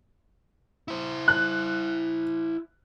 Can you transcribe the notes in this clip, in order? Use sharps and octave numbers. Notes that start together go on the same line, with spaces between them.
E4 C5
F#6